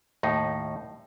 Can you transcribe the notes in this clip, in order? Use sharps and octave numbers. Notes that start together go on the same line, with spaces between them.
D#2 A2 D#4